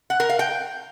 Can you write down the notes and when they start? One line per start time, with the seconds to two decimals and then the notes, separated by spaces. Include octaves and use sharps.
0.10 F#5
0.20 A#4
0.29 F5
0.39 G5